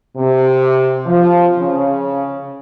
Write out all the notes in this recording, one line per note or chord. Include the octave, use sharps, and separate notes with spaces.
C3
F3
C#3